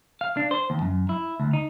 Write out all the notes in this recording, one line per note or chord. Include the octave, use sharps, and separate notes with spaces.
F5
D4
C5
D#2
F#2
E4
D2
D#4